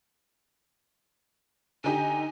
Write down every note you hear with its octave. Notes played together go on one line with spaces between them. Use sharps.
D3 D#4 G4 G#5